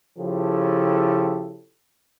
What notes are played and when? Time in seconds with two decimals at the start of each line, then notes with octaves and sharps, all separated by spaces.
0.18 C#3 F3 E4 G4 A4